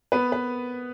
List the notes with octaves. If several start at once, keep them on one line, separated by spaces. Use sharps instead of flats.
B3 B4
B4